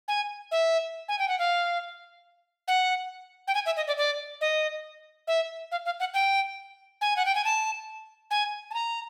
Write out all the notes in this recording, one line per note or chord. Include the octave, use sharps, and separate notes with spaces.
G#5
E5
G#5
G5
F#5
F5
F#5
G5
G#5
E5
D#5
D5
D5
D#5
E5
F5
F5
F#5
G5
G#5
F#5
G5
G#5
A5
G#5
A5
A#5